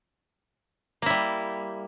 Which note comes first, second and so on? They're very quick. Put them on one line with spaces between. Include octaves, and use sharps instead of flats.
A#3 E4 G3